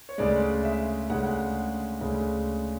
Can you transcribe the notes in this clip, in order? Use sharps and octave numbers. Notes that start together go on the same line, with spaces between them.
C#5
D2 C#3 G#3 D5
E5
D2 C#3 G#3 F#5
D2 C#3 G#3